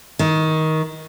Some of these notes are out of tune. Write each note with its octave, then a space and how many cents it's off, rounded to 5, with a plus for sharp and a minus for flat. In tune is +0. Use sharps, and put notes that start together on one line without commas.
D#3 +20